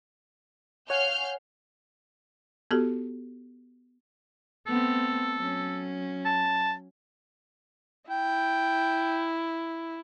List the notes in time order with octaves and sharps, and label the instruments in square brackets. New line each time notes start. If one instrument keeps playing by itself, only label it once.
[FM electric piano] C#5 F#5 G#5 [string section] F5 F6 G6
[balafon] B3 F#4 G4 A4
[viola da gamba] A3 B3 C4 [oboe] A4
[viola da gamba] F#3 C#4
[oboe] A5
[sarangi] E4 [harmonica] G5